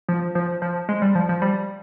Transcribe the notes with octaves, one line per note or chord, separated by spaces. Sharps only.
F3
F3
F3
G#3
G3
F3
F3
G3